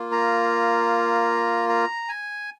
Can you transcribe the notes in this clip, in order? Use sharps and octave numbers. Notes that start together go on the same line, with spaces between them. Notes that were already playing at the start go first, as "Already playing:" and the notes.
Already playing: A#3 F4
A#5
A#5
G#5